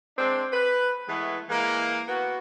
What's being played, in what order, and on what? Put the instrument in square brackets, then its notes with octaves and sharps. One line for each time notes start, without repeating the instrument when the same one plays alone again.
[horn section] G#3 C4 D4
B4
E3 G#3 A3 B3
E3 G#3 A#3
B3 F#4